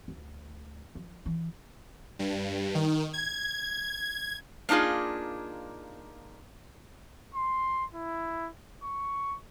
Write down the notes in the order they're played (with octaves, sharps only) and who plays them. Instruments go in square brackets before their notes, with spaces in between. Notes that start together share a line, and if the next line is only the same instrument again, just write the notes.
[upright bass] D2
F3
E3
[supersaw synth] G2
D#3
G#6
[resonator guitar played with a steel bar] A#3 D4 D#4 F4 G#4
[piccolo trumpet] C6
E4
C#6